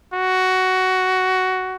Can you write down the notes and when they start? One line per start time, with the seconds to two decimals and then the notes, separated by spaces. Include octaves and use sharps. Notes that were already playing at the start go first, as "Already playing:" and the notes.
0.14 F#4